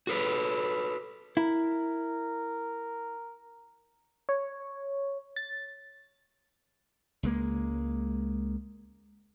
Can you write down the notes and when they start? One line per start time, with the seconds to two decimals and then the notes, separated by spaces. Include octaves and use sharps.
0.07 F#4 A4 B4
1.37 E4 A#4
4.29 C#5
5.36 A6
7.23 C#2 G#3 A#3